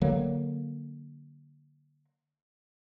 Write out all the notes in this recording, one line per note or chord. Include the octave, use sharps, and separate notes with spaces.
D3 F#3 A#3